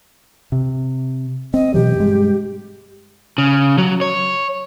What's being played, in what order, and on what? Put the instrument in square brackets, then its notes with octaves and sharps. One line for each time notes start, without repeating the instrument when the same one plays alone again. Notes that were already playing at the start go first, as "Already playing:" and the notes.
[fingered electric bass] C3
[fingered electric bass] C4 [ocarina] D#5
[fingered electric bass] B2 E3 F#3 [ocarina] G4
[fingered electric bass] G2 G#3
[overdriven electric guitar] C#3
F#3
C#5